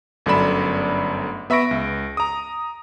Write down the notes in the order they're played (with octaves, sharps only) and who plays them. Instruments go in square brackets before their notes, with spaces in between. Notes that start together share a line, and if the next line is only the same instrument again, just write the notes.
[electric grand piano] G1 F#2 A3 D5 B5 E7
B3 E5 B5 C#6 A#6 D7
C#2
A#5 D#6